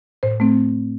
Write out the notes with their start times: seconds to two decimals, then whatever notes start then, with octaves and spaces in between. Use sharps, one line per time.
0.23 A2 C5
0.40 A3 C4